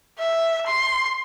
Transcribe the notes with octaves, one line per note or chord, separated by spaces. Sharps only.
E5
C6